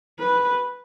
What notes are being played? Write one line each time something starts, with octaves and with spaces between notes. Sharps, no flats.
B4